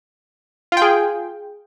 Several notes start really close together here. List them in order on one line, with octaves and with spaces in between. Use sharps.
F4 G5 G#4